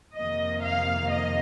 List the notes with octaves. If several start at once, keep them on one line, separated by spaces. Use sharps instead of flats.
F2 C3 D#3 A#3 D#5
F5
D#5